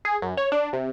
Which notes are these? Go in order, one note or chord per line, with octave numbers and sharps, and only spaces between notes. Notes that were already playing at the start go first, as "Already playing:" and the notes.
G#4
F#2
C#5
D4
C3